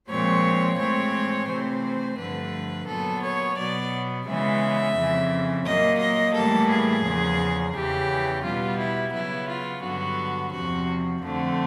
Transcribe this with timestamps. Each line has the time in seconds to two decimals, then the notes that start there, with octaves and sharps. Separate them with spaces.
0.09 A#2 F3 G#3 C4 C#5
0.79 A2 E3 G#3 C4 C#5
1.48 C3 E3 A3 C4 C5
2.18 G2 D3 F3 A3 B4
2.87 A#2 F#3 B3 A4
3.22 C#5
3.57 B2 F#3 B3 D5
4.27 C#3 E3 G#3 B3 E5
4.96 F2 C#3 E3
5.66 A#2 F#3 A#3 D#5
6.00 D#5
6.35 A2 E3 G3 A#3 A4
6.70 G#4
7.04 E2 C#3 F3
7.74 E2 C#3 E3 G4
8.43 B2 G3 B3 F4
8.78 E4
9.13 C#3 F#3 B3 E4
9.48 F4
9.82 G2 D3 F#3 B3 F#4
10.52 E2 C3 F3 F#4
11.22 F2 D3 F3 A3 C4